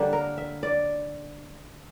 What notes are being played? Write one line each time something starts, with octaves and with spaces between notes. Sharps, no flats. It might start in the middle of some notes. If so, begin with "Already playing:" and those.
Already playing: D3 G3 A#3 D4
A#4
E5
D5